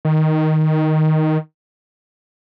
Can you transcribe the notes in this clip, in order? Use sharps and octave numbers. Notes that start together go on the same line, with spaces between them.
D#3